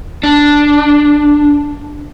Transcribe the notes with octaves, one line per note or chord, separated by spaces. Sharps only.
D4